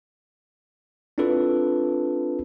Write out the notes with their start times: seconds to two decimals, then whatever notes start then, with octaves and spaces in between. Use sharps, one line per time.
1.18 C4 D4 E4 F4 A4 B4